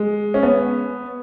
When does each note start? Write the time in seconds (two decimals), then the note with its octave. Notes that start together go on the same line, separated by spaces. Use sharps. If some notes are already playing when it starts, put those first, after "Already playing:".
Already playing: G#3
0.34 C#4
0.43 B3